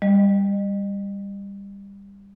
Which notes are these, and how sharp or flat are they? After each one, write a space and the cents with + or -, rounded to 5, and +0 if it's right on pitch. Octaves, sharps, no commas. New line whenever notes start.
G3 +20 D#5 -35